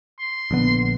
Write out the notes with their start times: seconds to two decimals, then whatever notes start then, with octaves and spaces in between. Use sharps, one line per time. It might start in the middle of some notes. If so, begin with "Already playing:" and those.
0.20 C6
0.51 A#1 D3 B3